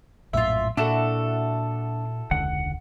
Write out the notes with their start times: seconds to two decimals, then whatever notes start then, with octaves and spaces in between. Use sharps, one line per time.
0.33 A#1 F#2 A2 F4 E5
0.77 A#2 D4 E4 F#4 A4 A5
2.31 E1 C#2 D3 F#5